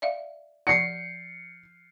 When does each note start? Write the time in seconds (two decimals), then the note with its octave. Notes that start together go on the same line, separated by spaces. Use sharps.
0.02 D5 E5 F5
0.67 F3 D5 F#5 C7 C#7